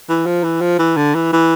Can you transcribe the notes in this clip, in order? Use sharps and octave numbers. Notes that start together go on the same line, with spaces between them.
E3
F3
E3
F3
E3
D3
E3
E3